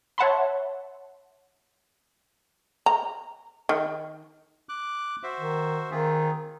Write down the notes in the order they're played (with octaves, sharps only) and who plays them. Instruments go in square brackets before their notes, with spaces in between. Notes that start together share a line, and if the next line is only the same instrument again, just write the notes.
[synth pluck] C#5 E5 F#5 A5 B5 C6
[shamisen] A#5
D#3
[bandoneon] D6 F#6
F#4 C5 E5
[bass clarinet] D#3
[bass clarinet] D#3 [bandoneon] C4 F4 G#4